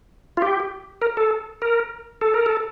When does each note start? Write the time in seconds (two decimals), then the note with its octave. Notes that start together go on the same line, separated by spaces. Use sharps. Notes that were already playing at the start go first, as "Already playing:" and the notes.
0.37 F4
0.42 G4
1.02 A#4
1.17 A4
1.62 A#4
2.21 A4
2.34 A#4
2.46 A4